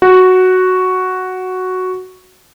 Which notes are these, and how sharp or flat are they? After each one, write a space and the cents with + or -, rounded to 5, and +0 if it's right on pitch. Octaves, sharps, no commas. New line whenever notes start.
F#4 +0